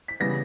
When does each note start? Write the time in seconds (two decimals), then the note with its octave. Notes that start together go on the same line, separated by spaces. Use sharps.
0.08 B6
0.20 C#3 E3 G3 B3 A#6